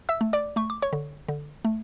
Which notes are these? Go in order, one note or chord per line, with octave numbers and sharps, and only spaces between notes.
E5 E6
A3
D5 D6
A3 C#6
D6
C#5 C#6
D3
D3
A3